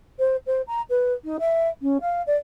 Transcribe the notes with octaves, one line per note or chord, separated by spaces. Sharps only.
C5
C5
A#5
B4
D#4
E5
C#4
F5
D5